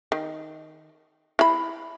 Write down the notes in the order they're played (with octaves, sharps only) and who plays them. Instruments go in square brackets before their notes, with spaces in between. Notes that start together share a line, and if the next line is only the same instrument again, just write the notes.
[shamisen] D#3
E4 B5